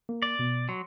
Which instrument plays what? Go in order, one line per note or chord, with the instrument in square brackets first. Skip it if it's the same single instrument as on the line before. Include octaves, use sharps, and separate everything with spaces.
[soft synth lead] A#3
[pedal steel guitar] D5
[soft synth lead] B2
[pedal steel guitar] F#3 [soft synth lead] C6